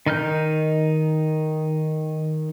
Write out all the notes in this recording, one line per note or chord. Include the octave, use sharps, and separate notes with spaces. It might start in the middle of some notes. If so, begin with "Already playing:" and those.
D#3 D#4 F6 G6